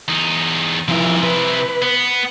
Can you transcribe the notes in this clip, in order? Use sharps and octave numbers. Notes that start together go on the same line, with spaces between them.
E2 D#4
C3 F3 E4 A#4
B4
B3